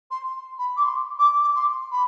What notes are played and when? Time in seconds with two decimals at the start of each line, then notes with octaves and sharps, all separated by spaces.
0.10 C6
0.58 B5
0.76 D6
0.82 C6
1.19 D6
1.42 D6
1.55 C6
1.91 B5